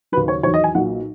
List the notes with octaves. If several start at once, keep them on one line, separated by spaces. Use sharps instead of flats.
D#2 C#3 F#3 B4
C#5
E2 D#3 F#3 C#5
D#5
G#5
B1 A#2 F#3 F#5